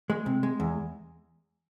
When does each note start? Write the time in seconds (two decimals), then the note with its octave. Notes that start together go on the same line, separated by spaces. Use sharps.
0.10 G#3
0.26 C3
0.43 G#3
0.60 E2